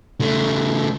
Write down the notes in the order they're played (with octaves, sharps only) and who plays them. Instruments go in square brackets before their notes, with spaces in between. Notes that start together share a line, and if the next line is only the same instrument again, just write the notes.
[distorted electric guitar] C#3 A3